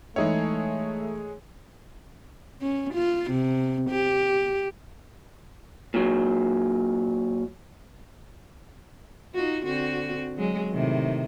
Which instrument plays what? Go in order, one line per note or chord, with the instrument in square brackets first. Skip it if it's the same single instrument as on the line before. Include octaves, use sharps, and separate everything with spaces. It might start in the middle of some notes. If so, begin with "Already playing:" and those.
[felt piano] E3 D#4 E5 [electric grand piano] G#3 G#4 C#5 [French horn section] A3
[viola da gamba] C#4
F4
C3
G4
[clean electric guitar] A#2 F#3
[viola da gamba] D#4 F4 F#4
D3 C4 F#4
F#3 G#3
A2 C3 D#3